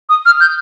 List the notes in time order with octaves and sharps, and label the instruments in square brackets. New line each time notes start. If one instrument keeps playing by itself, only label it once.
[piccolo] D#6
F6
G6